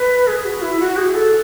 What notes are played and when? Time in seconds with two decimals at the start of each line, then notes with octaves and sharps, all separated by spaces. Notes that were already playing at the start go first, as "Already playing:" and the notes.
Already playing: B4
0.27 G#4
0.45 F#4
0.62 E4
0.80 F#4
0.97 G#4
1.14 A4